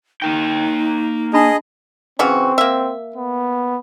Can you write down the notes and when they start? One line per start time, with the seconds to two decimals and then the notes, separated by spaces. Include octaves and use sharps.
0.22 A#3 D#4 A#4 G5
1.33 D4 G#4 D#5 A5 B5
2.19 C#3 E3 C4 F#4
2.58 A#3 E5
3.16 B3